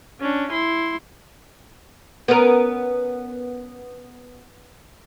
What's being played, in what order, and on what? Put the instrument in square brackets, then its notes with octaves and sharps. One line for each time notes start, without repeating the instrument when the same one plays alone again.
[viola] C#4 D4
E4 C6
[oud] B3 C#4 A#4